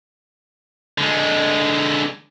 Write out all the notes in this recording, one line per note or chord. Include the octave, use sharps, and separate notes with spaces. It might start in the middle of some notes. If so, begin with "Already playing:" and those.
D3 G#3